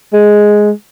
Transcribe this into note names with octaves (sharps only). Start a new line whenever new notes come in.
G#3